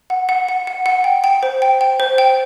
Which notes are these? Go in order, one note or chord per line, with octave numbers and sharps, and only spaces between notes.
F#5
F#5
F#5
F#5
F#5
G5
G5
C5
G5
G5
C5
G5